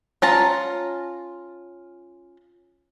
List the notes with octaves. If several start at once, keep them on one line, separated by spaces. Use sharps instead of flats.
C#4 F4 A5 A#5